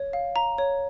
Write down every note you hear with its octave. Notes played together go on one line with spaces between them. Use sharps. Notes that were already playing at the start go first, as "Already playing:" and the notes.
Already playing: C#5
F5
A#5
C#5